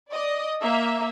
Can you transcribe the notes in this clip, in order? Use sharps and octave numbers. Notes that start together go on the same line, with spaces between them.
D5 D#5
A#3 E5